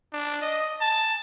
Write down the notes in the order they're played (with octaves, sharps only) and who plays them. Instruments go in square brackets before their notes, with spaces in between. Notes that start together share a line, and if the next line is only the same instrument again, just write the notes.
[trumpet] D4
D#5
A5